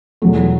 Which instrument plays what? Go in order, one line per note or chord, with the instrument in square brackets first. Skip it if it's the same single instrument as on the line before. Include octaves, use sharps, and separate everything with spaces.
[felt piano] E2 B2 F#3 A3